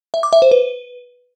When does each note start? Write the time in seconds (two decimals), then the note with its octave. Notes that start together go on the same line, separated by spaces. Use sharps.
0.14 E5
0.23 D6
0.33 E5
0.42 C5
0.51 B4